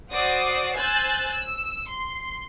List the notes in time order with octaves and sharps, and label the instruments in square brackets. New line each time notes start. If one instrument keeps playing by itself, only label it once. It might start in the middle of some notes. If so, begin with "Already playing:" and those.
[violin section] F#4 C5 D5 D6 D#6 C7
C5 G#5 E6 F#6 G6 A6
E6
C6